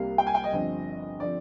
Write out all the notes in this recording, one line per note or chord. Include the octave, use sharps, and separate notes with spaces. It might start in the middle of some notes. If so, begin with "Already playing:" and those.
Already playing: C2 C3 G3 A#3 F5
G5
G#5
G5
D#5
G1 G2 F3 C4
D3 F3 C4 D5